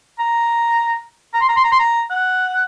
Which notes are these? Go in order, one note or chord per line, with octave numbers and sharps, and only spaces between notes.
A#5
A#5
C6
A#5
C6
A#5
C6
A#5
F#5